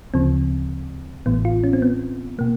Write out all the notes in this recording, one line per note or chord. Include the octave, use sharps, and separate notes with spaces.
D2 C#3 F3 C4
A1 A2 E3 B3
F4
C#4
C4
B3
B2 A#3